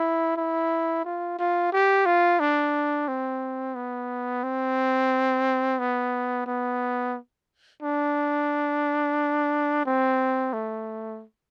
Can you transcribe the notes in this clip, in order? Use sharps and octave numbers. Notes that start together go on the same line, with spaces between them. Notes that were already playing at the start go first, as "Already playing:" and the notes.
Already playing: E4
E4
F4
F4
G4
F4
D4
C4
B3
C4
B3
B3
D4
C4
A3